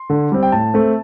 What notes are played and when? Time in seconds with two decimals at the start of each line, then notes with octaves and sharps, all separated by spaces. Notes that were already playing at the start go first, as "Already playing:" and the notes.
Already playing: C6
0.10 D3
0.32 G3 C4
0.43 G5
0.52 A2 A5
0.74 A3 C4